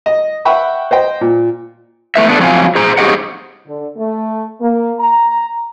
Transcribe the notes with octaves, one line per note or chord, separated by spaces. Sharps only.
D#5
E5 F#5 G5 B5 C#6
C5 D#5 G5
A#2
E2 A3 B4 E5
B3 D4 A4
F3 F#3 C4 D#5 F5 G#5
G#4 C5 A#5
G4 G#4 C5 C#5 D#5 F#5
D3
A3
A#3
A#5